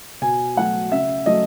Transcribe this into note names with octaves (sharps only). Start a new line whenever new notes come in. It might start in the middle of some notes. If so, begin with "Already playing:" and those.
B2 G#5
F#3 A3 F#5
C#3 E5
F#3 A3 D#5